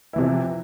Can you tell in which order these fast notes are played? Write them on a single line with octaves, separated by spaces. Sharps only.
E4 E3 C3 F3